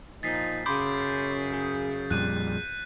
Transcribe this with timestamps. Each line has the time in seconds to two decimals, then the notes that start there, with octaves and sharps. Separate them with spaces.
0.23 A#2 F3 D#4 A6 B6 C7
0.66 F#2 C#3 B5 C6 D6 G6
1.53 G#4
2.11 F2 A#2 G3 F#6 D#7